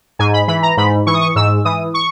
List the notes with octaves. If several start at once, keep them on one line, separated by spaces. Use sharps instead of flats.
G#2 G#5
B5
E3 B5
A#5
G#2 B5
E3 C#6
D#6
C#6
G#2 E6
E3 D#6
C#6